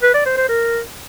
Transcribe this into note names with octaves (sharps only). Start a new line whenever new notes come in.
B4
D5
C5
C5
A#4